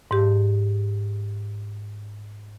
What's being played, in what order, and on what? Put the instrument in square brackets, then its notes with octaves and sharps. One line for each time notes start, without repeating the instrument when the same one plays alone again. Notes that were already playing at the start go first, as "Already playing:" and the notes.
[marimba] G#2 G4